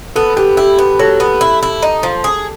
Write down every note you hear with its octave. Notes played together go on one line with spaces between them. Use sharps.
B3 A4
B3 G4
E4 G4
B3
F#3 A4
B3
E4
E4
D#4
F3
G#4